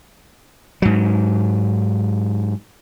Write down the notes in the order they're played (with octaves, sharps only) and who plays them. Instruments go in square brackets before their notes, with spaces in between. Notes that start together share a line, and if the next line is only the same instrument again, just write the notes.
[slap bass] G#2 F#3